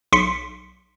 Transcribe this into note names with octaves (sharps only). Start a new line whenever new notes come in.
B1 C6 B6 C#7